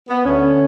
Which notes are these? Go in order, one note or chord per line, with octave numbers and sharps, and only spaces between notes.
B3
D2 D3 A3 C#4